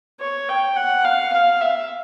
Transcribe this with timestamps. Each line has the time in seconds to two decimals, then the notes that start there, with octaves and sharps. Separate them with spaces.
0.20 C#5
0.49 G5
0.76 F#5
1.05 F5
1.33 F5
1.61 E5